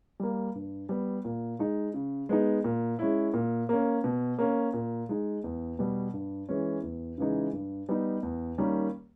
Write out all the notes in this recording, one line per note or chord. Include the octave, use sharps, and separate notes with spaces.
G3 A#3
G2
G3 B3
A#2
G#3 D#4
C#3
G#3 B3 D#4
A#2
G#3 C#4 E4
A#2
A#3 C#4
B2
A#3 C#4
A#2
G#3 D#4
E2
B2 G3 B3
G2
E3 G#3 C#4
E2
C#3 E3 G#3 D#4
G2
G3 B3 D#4
E2
D#3 G3 A#3 C#4